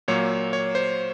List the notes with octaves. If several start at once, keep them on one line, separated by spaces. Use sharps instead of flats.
A#2 F#3 A#3 C#5
C#5
C5